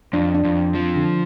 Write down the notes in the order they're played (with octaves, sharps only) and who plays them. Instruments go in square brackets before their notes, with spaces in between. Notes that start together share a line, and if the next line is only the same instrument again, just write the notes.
[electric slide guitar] F2 [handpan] D4
[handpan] D4
[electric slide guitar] F2
F3
[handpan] D3